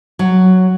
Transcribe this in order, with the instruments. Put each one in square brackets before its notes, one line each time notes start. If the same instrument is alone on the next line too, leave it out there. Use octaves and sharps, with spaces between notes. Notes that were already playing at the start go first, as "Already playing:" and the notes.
[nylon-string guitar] F#3